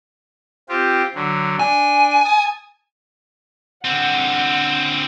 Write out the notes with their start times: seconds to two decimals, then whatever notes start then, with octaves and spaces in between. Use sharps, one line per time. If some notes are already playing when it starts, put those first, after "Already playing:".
0.69 C4 F4 G4
1.15 D3 F#3
1.59 D4 G#5
2.25 A5 D#6
3.85 D3 C4 F#5